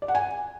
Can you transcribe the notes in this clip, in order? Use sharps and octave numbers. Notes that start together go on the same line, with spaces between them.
D5
F#5
G#5